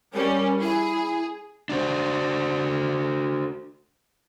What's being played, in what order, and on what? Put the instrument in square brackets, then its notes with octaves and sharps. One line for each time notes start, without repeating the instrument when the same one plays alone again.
[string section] G3 C#4 [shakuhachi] A#4
[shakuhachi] E4 [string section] G#4
[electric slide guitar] D4 F#4 C5